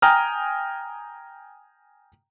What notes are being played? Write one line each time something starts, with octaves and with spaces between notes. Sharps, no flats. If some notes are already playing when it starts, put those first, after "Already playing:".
G5 G#5 A#5 D#6 F6